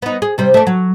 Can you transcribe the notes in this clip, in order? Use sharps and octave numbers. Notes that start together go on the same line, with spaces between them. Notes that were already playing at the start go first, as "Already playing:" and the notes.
B3 D#4
G#4
C3 G3 C5
A3 D5
F#3